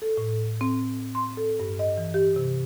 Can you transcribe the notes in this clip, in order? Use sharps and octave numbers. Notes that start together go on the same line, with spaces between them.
A4
A2
C4
C6
A4
G2
D#5
E3
G4
C3